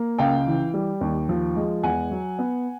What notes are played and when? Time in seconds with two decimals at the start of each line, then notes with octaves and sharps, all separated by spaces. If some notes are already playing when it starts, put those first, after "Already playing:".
Already playing: A#3
0.18 C#2 F5 G5
0.47 E3
0.74 G3
1.01 D#2
1.29 F3
1.56 G#3
1.83 E2 F#5 G#5
2.11 F#3
2.39 B3